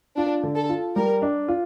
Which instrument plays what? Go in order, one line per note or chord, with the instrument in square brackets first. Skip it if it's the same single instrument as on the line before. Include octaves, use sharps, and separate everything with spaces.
[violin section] D4 [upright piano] F4
[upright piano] D3
[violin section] A4
[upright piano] F4
[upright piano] G3 [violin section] A#4
[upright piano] D4
F4